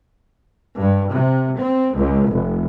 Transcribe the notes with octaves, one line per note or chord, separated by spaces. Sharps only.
G2
C3
C4
C#2
F1